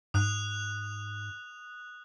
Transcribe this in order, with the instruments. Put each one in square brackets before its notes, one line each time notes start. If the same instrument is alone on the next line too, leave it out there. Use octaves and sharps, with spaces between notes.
[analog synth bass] G#2 [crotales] D#6 F#6 F7